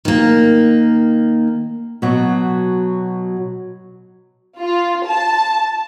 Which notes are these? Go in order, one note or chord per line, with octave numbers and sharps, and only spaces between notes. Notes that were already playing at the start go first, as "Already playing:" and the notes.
D#3 A#3
B2 F#3
F4
A5